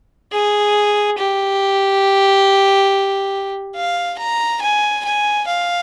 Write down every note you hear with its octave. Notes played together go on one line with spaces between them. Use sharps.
G#4
G4
F5
A#5
G#5
G#5
F5